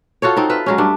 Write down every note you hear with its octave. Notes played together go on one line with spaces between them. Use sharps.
F4 F#4 A4 C#5
C4 D#4
F4 B4 E5
F#3 G#3 C#4
G2 A3 D4